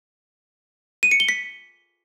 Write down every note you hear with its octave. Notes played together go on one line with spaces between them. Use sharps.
D#7
C#7
G7
B6